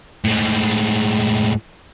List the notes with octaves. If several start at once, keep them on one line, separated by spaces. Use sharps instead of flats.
A2 G#3